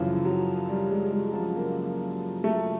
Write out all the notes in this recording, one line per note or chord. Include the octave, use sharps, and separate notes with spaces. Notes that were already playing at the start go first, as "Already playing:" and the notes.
Already playing: F#2 C#3 E3 F3
F#3
G3
G#3
G#3
F3
A#3
A3